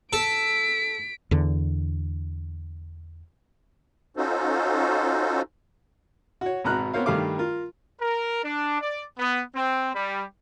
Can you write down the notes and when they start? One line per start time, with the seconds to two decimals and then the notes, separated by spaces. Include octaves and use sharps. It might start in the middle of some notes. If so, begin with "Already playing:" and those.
0.13 A4 B6 D7
1.31 E2 D3
4.17 C#4 D#4 F4 F#4 A4 C5
6.41 F#4 C#5
6.64 G#1 B2 B3 A#5 F6 F#6
6.94 B3 C4 A#4 C5 C#5 F5
7.06 G2 D#3 G3 A3 F5 D6
7.38 F4 A#4
8.01 A#4
8.44 D4
8.81 D5
9.19 B3
9.56 C4
9.95 G3